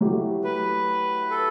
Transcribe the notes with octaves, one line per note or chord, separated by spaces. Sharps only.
F#3 A3 E4 G4
B4
A4